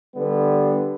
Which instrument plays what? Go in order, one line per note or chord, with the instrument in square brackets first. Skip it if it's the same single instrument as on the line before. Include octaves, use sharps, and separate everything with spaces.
[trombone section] D3 G3 B3